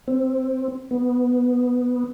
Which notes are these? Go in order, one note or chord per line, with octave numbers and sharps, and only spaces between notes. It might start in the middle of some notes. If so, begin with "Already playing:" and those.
C4
B3